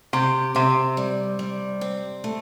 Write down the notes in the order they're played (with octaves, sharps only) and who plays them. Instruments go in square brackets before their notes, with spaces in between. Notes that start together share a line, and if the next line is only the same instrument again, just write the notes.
[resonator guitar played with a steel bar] C3 [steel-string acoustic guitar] G4
[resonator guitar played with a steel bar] C3 [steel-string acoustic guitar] C4
[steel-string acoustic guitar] G3
G3
C4
A3